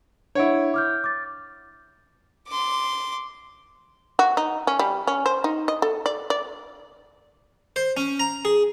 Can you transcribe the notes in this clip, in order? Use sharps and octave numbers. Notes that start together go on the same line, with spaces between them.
D4 E4 C#5 F#5 D7
D6 F6 G6
D6 A6
C6 D6
F#4
D#4
C#4
G3
C#4
C5
D#4
D#5
A4
D5
D5
C5
C#4
A#5
G#4